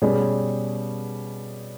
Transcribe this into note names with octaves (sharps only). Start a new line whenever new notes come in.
B2 G3 C#4 G#4 C#5